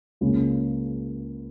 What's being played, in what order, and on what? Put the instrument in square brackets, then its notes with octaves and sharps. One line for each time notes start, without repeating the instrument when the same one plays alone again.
[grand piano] C#2 C#3 A#3 C#4